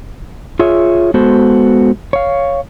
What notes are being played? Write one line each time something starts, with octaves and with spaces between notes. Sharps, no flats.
F4 G#4 C#5 E5
G#3 B3 F#4 A4 C5
C#5 F5